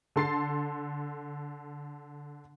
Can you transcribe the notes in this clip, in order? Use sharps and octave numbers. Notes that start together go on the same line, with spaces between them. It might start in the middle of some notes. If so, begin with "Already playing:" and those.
D3 A4 C6 A6 C7